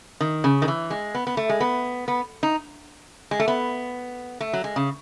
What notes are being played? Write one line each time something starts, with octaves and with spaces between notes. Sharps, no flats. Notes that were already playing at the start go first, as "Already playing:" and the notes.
D#3
C#3
D#3
E3
G#3
B3
B3
A3
G#3
B3
B3
D#4
G#3
A3
B3
A3
F#3
G#3
C#3